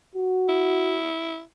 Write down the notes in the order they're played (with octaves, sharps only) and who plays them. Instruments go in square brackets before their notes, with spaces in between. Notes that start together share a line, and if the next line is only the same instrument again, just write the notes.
[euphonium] F#4
[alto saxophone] E4